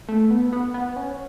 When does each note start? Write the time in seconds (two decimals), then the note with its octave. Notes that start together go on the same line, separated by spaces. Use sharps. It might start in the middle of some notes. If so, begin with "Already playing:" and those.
0.09 A3
0.30 B3
0.53 B3
0.74 B3
0.96 C#4